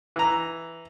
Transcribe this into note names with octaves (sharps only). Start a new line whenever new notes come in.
E3 A#5